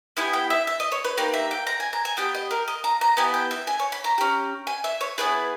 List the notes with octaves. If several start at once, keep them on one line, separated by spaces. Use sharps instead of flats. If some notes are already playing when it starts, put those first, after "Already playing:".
B3 E4 G4 G#5
G5
E5
E5
D#5
C#5
B4
A#3 D#4 G4 B4
E5
G5
A#5
G#5
A#5
G#5
B3 G4 G5
D#5
A#4
D#5
A#5
A#5
B3 E4 G4 G#5
G5
E5
G#5
C#5
B5
A#5
C#4 G4
G#5
E5
C#5
B3 E4 G#4 B4